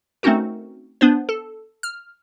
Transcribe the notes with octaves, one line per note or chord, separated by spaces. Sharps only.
A3 C4 C#4 D#4 F#4 A#4
B3 D4 C5
A4
F6